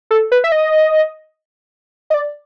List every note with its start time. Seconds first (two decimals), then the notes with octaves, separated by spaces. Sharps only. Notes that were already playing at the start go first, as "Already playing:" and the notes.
0.11 A4
0.32 B4
0.44 E5
0.52 D#5
2.10 D#5
2.14 D5